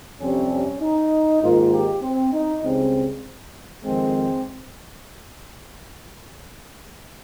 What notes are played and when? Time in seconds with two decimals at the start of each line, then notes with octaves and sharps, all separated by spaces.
0.20 F2 C3 G3 C4 C#4
0.50 C#4
0.81 D#4
1.42 G#2 D#3 A#3 F4
1.72 G4
2.02 C4
2.32 D#4
2.63 C#2 C#3 G3 C4
3.83 F2 D#3 G#3 C4